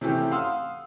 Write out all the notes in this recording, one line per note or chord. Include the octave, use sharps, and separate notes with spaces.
C3 E3 A3 C4 C#4 G4
F5 F#5 C6 D#6 E6